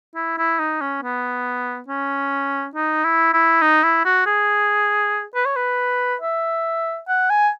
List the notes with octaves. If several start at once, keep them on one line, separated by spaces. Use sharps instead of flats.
E4
E4
D#4
C#4
B3
C#4
D#4
E4
E4
D#4
E4
F#4
G#4
B4
C#5
B4
E5
F#5
G#5